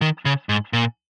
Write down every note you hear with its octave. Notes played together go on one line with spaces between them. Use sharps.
D#3
C#3
G#2
A#2